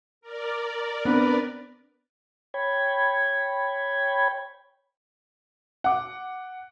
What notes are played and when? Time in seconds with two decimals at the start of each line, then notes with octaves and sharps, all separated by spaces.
0.21 A#4 D5
1.05 B3 C4 D4 B4
2.54 C#5 G5 B5 G#6
5.84 F#5 D6